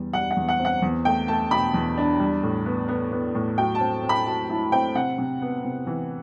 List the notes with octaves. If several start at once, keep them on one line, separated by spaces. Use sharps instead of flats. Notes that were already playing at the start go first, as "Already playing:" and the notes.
Already playing: E2 G3
G3 F#5
F#5
E2
F#5
C4
F#5
E2
A3 G5
A3 A5
B2 B5
E2
D4
G3
A2
B3
B3
B3
A2
F#3 G5
A5
C4
C4
B5
F#3 A5
E4 A5
C4 G5
C3 F#5
C3
B3
C3
E3